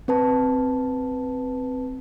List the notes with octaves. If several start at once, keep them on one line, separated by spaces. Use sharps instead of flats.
C4 B4 A5